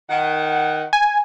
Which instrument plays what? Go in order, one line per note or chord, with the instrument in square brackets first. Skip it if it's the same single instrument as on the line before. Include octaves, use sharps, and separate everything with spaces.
[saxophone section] D#3 F#5
[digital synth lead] G#5